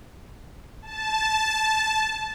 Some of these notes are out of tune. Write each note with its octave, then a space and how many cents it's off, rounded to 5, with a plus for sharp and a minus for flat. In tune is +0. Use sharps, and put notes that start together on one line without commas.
A5 -10